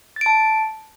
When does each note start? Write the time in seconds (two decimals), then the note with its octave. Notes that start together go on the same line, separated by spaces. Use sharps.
0.16 A6
0.21 D7
0.26 A5